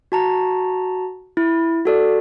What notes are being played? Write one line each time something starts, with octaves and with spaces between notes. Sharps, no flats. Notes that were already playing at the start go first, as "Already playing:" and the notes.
F#4 A5 A#5
E4
F#4 A4 D5